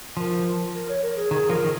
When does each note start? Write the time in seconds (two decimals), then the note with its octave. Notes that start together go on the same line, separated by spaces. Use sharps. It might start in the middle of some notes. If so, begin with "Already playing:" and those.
0.17 F3 A#4
0.73 A#4
0.89 C#5
1.03 A#4
1.17 G#4
1.31 D#3 G#4
1.50 F3 A#4
1.64 D#3